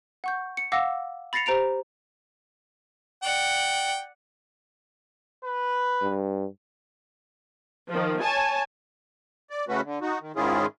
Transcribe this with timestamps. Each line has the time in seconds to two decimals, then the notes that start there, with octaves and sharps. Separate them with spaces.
0.24 F#5 C#6 G6
0.57 C#7
0.72 F5 F#5 D6 E6 A#6
1.33 B5 A6 A#6 C7 C#7 F7
1.46 G4 C5 A#5 D7 F7
3.23 D5 F#5 G5
5.45 B4
6.02 G2
7.90 D#3 F3
8.20 C#5 G#5 A5
9.50 D5
9.69 C#3 A3 C#4 F#4 B4
9.84 D3
10.02 D#4 F#4
10.21 D#3
10.36 G#2 D#3 C#4 E4 F4 G#4